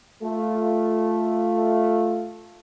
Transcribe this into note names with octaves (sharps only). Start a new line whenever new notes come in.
A3 F4